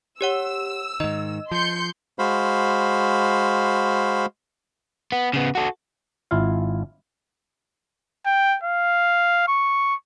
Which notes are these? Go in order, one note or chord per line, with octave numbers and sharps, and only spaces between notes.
G4 C#5 F#5 E6
G#2 D#3 D#5
F3 C6 G6 C#7
G#3 F#4 C5 F5 B5
B3
C#3 B3
F#4 A4
G#1 E4 F4 F5
G5
F5
C#6